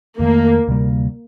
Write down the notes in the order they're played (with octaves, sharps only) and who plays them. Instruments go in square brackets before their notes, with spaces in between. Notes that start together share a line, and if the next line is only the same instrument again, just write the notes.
[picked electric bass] F2 D#3 A3 [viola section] A#3
[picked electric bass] D2 C3 G3 A#3